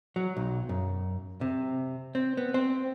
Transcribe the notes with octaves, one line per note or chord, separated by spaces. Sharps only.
F#3
B1
F#2
C3
C4
B3
C4